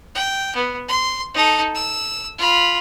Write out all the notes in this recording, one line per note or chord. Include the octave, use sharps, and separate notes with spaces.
G5
B3
C6
D#4 A4
E6
F4 B5